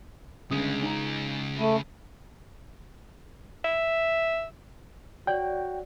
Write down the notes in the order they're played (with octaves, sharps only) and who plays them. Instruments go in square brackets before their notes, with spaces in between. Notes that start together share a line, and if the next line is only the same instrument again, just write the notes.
[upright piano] G1 C#3 D#6 [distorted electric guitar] C#2 G#3
[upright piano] D#4 A#5
[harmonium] A3 [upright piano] B5 D#7
[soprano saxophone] E5
[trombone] F#4 [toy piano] C#5 D5 [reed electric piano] G5